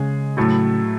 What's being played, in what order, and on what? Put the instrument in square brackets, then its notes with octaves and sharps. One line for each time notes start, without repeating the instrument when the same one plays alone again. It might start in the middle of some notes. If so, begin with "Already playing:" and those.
Already playing: [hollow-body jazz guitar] C#3 [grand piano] G#3 G#4
[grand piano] A2 F#3 A3 E4